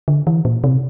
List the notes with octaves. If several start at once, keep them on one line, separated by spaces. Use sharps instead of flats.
D3
E3
A#2
C3